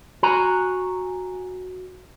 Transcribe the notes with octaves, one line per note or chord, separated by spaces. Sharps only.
F#4 G#5 A#5